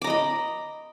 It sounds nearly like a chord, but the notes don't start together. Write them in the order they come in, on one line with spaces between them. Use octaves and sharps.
D6 A#5 D#5 B5